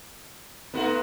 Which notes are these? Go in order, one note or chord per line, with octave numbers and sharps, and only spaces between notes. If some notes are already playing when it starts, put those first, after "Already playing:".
G#2 A3 B3 D#4 F#4 F#5